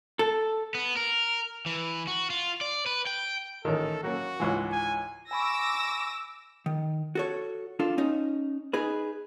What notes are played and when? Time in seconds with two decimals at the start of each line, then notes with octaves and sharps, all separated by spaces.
0.19 A4
0.75 B3
0.97 A#4
1.66 E3
2.07 F#4
2.30 F4
2.61 D5
2.86 B4
3.07 G5
3.65 A1 D#3 A4
4.03 F#3 A#3 C#4 F#4
4.40 C#2 G#2 E3
4.72 G#5
5.31 G#5 B5 C#6 D6 E6 A#6
6.66 D#3
7.15 F#4 A4 C#5
7.79 D4 F4 A4
7.98 C#4 D#4
8.73 D#4 G#4 B4